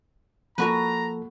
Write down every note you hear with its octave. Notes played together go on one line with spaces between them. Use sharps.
F3 A#3 F#4 A4 B4 A#5